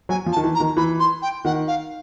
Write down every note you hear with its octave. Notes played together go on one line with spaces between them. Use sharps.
F#3 G#5
F3
A5
D#3
E3
A#5
D#3
E3 B5
C6
G5
D#3 F#5
F5